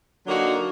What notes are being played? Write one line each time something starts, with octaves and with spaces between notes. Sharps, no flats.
D3 F#3 A#3 D#4 F#4